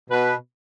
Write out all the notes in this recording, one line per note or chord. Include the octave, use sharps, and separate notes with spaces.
B2 B4